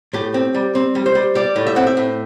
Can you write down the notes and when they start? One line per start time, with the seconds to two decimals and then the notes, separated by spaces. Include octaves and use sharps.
0.13 A2 G4
0.34 C4
0.54 G3
0.75 C4
0.95 G3
1.06 C5
1.15 G3
1.35 G3 D5
1.56 A2
1.67 E5
1.76 C4 F#5
1.87 E5
1.97 A2